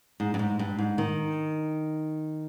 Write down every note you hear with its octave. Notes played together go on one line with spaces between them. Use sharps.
G#2
G2
G#2
G2
G#2
D#3